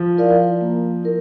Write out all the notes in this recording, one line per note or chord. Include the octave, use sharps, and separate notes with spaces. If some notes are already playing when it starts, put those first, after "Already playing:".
Already playing: F3
E4 A#4 D5 F5
A#3
E4 A#4